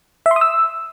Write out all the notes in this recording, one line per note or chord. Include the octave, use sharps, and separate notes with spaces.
E5
C6
D#6
E6